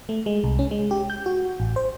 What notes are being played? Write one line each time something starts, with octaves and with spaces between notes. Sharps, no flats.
A3
G#3
C2
C#4
G#3
G4
G6
F#4
A1
C5